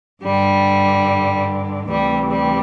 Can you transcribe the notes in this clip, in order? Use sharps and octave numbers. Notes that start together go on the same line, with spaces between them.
G2 D3 G3
D2 C3 E3 G3
G3